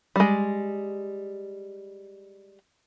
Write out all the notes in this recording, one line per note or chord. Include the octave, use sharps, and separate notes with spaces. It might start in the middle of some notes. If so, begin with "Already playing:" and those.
G3 G#3